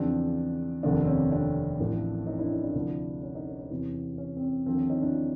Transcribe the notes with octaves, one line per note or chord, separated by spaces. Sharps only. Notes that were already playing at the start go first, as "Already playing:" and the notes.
Already playing: E2 C#3 F3 C4 D4
F1 D#2 D3 F3 C4 D4
C4
C#4
C4 D4
A1 A2 F3
C#4 D#4
D4 E4
C#4 D#4
D4 E4
D2 C3 F3
C#4
C#4 D#4
C#4
C#4
E2 C3 E3
C#4
C4
C#4
D#2 D3 F3 C4
C#4
C#4 D#4
D4 E4